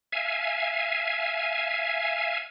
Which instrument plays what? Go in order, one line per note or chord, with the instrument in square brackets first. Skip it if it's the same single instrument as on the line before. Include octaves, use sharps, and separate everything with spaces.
[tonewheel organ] E5 F5 G#5